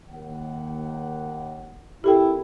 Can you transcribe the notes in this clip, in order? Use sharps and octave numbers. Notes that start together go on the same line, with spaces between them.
D#2 F#5
A#1 C4 E4 G4 A4 A#4 G5